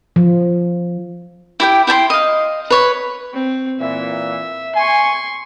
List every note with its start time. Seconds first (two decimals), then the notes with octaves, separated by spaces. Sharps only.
0.16 F3
1.60 E4 G4 G5
1.87 E4 G5 G#5 C6
2.10 D#5 F5
2.70 B4 C#5
3.34 C4
3.80 A#2 E3 E5
4.75 G#5 C6 C#6